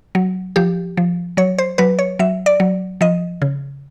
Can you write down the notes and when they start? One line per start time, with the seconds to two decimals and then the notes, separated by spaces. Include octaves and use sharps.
0.15 F#3
0.56 F3 G4
0.97 F3
1.37 F#3 C#5
1.58 C5
1.78 F#3 B4
1.99 C#5
2.19 F#3 E5
2.46 D5
2.60 F#3
3.01 F3 D#5
3.42 C#3